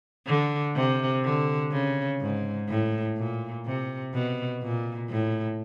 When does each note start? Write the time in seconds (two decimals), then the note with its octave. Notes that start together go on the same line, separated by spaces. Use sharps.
0.26 D3
0.75 C3
1.24 D3
1.71 C#3
2.21 G#2
2.68 A2
3.17 A#2
3.66 C3
4.13 B2
4.62 A#2
5.10 A2